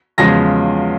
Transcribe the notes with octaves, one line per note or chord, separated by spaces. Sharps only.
E2 C#3 F3 G#3 A#6